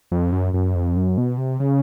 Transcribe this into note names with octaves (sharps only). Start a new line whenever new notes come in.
F2
F#2
F#2
F2
F#2
B2
C3
C#3